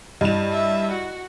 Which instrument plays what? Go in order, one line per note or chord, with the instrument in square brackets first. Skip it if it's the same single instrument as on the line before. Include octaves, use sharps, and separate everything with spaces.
[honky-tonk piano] G2 E7 [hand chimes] E4 D#5
[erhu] E5
F#4